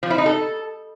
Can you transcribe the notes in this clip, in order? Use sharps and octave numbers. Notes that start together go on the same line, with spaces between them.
F3
E4
D#4
A4